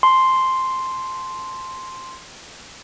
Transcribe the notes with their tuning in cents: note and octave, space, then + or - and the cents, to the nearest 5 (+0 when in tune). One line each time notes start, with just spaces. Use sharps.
A5 -15 C6 +0